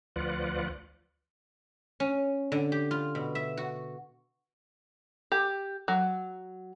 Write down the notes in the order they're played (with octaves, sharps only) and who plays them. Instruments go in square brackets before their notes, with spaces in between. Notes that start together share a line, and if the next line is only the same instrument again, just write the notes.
[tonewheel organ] D2 F3 F4 B4 D5 F#5
[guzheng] C#4
D3
G4
F4
B2
E5
F#4
[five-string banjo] G4
F#3